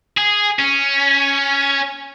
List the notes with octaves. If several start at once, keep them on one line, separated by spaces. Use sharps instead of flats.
G#4
C#4